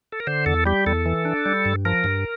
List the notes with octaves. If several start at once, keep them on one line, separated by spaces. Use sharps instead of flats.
A4
A#4
D3 C5
E2 A4
G3 G4
E2 A4
E3
D4
G3
G2
F3 A#4
G2